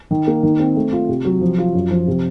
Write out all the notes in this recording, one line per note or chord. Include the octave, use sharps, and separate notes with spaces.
D#3
A#3
D#3
C4
A3
F4
C3
F#3
F3
F4
F#2
F3
C3